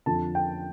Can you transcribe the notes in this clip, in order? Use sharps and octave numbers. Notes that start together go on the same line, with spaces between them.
F2 D3 F3 A5
G5